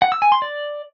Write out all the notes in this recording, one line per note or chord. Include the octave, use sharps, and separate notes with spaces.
F#5
E6
G#5
C6
D5